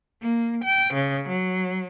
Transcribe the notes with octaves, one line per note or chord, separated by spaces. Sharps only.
A#3
G5
C#3
F#3